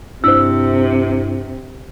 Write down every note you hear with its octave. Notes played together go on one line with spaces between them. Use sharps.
G2 C3 D4 E4 C5 E6